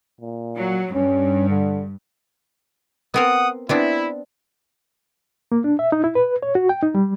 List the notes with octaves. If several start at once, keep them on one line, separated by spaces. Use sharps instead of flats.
A#2
F#3
G2 C#4
D3
B3 C4 A#4 F#5 D#6
B3 C4 D4 E4
A#3
D4
E5
D#4
E4
B4
C#5
F#4
G5
D#4
G3